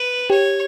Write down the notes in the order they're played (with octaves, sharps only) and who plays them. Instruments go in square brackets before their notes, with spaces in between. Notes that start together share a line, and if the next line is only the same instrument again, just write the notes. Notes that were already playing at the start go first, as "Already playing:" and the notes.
Already playing: [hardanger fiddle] B4
[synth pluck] G4 [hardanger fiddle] C#5